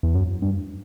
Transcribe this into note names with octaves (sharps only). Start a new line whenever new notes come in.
E2
F#2
G2